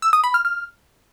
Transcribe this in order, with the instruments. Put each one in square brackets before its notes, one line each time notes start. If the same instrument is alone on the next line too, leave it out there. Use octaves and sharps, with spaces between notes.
[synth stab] E6
D#6
B5
F6
F6